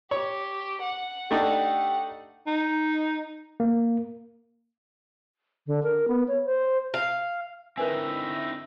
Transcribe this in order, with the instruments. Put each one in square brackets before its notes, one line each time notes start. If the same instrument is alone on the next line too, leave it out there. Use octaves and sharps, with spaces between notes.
[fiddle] G4 [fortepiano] C#5
[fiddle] F#5
[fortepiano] A3 D4 D#4 [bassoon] G4
[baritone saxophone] D#4
[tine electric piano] A#3
[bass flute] D3
A#4
B3
C#5
C5
[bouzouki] F5
[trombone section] D3 E4 [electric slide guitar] C4 D#4 [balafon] A#4 B4 G#5 [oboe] E5